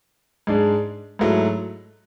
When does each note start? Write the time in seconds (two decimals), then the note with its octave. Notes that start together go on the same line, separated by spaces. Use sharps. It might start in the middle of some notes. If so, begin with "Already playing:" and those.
0.47 G#2 G#3 D4
1.19 G#2 F#3 A3 E4